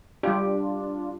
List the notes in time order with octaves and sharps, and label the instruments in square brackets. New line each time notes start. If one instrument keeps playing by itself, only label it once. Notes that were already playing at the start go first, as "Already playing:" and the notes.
[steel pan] G3 G4 [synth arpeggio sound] D4 F4